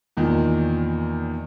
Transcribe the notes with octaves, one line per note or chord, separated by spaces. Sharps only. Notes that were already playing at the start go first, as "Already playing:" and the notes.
E2 A#2 D#3